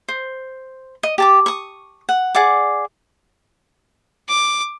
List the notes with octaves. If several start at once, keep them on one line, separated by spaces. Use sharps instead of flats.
C5
D#5
G4 A5 D6
C#6 D#6
F#5
G#4 D5 F#5 D6
D6